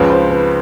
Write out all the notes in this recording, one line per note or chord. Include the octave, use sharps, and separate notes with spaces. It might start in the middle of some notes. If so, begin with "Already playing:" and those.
Already playing: C#2 C#3 F3 B4
C5
B4